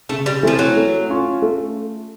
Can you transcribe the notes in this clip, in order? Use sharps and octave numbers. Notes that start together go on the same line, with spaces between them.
C#3 A3
G3
E3 F3 A3 C4 E4
F#3
A3
C#4 F4
A3